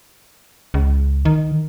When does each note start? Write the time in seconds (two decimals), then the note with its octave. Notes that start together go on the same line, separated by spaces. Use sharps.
0.74 C#2
1.25 D#3